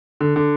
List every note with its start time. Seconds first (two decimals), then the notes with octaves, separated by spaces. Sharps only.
0.21 D3
0.36 D3